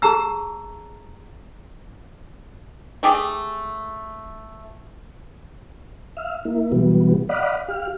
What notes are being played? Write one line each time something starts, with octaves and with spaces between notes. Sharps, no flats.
G4 G#4 A5 A#5 E6
A3 G4 G#4
E5 F5
A#3 E4
B2 E3 F#3 G3 B3
D5 D#5 F5 F#5 B5
G4 F5